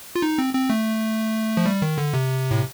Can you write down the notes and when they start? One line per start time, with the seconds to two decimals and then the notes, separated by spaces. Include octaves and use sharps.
0.16 F4
0.22 D#4
0.38 C4
0.54 C4
0.70 A3
1.57 F3
1.66 G3
1.82 D#3
1.98 D3
2.14 C3
2.51 A2